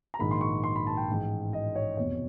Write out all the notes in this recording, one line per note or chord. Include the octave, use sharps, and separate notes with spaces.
A#5
A#1 G#2 D#3 B5
C6
C#6
C6
B5
A5
G5
A1 G#2 E3
D#5
C#5
F1 E2 B2 C#5